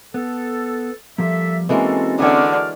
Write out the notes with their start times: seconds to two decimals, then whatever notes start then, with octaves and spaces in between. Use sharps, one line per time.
0.14 B3 A4
1.18 F3 G3 A#3 A4 E5
1.69 E3 G#3 A#3 C4 C#4 F#4 A4 C5
2.20 D3 F#4 G#4 C#5 D5 E5 F6